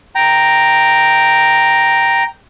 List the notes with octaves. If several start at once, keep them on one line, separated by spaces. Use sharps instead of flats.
G5 A#5